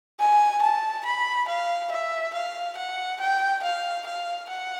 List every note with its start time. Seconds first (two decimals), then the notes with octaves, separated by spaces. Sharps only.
0.20 G#5
0.62 A5
1.06 B5
1.48 F5
1.92 E5
2.34 F5
2.77 F#5
3.20 G5
3.63 F5
4.06 F5
4.49 F#5